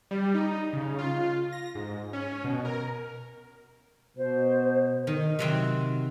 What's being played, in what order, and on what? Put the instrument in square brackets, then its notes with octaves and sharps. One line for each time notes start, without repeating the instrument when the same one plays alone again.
[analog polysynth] G3
D#4
C#3
F4
A#6
G#2
C#4
B2
A#4
[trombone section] B2 [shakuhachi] C5
[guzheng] D#3
C3 F#3 C4